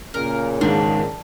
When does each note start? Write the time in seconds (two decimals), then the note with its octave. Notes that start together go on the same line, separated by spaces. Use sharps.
0.14 A#2 C#3 A#4
0.61 G#2 D#3 D4